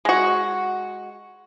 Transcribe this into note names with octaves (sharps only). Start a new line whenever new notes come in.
G#3 F#4